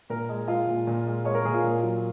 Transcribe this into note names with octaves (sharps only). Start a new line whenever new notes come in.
A#2 A#4
G#3
G#3 F4
A#2
A#2
G#3
G#3 C#5
A#4
A#2 G#4
F4
A#2
F#3